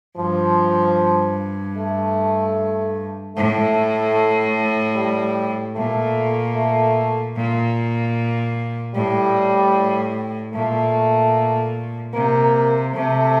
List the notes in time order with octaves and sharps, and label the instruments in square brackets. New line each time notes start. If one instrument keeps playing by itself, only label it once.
[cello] G2 [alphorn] F3
[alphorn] A3
[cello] A2 [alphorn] A3
[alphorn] G3
[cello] A#2 [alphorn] A3
[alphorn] A3
[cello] A#2
[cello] A2 [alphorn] G3
[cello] A#2 [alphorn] A3
[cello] C3 [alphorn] A#3
[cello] C3 [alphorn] A3